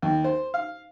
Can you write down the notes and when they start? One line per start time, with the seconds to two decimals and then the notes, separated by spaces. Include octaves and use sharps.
0.02 D#2
0.24 C5
0.54 F5